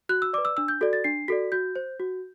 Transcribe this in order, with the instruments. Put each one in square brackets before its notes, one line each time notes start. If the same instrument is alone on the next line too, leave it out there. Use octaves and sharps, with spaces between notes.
[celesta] F#4 F#6
E6
B4 D5 D6
E6
D4 E6
G6
F#4 A4 D5
A6
D4 C7
F#4 A4 D5 B6
F#4 G6
C5
F#4